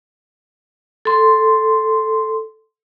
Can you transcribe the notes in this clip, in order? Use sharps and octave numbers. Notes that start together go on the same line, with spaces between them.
A4 C6